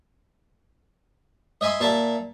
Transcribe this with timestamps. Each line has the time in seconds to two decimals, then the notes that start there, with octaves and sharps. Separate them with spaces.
1.61 D#5 E5 G#5 B5 C6
1.81 A#2 E5 A5